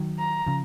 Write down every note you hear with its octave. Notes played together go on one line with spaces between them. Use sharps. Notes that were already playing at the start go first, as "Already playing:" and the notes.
Already playing: D#3 F#3
A#5
C#3 F3